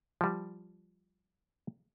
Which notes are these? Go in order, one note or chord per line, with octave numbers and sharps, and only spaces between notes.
F3 G3